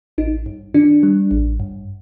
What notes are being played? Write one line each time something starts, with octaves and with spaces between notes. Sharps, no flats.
A1 D#4
G2
D#3 D4
G3
A1
G2